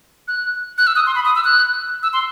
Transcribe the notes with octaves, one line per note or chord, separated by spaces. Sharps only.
F#6
F#6
E6
D#6
C6
B5
D#6
E6
F#6
E6
C6